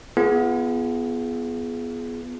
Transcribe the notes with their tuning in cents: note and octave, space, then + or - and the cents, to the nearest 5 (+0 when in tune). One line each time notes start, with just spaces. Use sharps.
B3 +0 F4 -35 G#4 +15